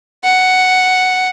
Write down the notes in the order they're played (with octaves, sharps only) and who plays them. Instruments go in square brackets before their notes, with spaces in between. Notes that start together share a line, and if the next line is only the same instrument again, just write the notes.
[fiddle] F#5